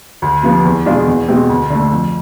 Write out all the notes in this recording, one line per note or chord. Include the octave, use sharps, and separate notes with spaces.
D2
C3 F3 B3
E2
B2 G#3 D4 F4
E2
B2 G#3 C4
D2
D3 A3
F2